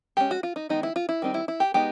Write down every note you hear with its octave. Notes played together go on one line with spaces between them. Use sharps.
G#3 C#4 G4
F#4
F4
D#4
D#3 G#3 B3 D#4
E4
F4
E4
D#3 G3 C4 D#4
E4
E4
G4
G#3 B3 D#4 G4